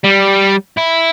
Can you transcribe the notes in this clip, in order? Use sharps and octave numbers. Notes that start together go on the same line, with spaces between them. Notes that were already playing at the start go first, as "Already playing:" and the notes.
G3
E4